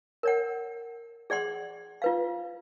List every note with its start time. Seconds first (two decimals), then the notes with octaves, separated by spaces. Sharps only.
0.23 A#4 C#5 F#5
1.30 G#4 D5 F#5 C6
2.02 F4 B4 F5